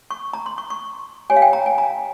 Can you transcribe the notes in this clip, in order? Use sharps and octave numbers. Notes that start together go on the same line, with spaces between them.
C#6
A#5
C6
C#6
C#6
G4 C#5 G#5
F5
G5
A#5
G#5
A#5